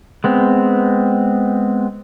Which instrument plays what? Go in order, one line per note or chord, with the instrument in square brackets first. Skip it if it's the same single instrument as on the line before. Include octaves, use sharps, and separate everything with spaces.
[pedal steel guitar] G#3 B3 C4